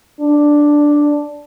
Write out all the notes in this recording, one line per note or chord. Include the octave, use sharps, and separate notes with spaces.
D4